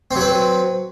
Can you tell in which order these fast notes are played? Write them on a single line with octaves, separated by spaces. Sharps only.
C4 F#3 B4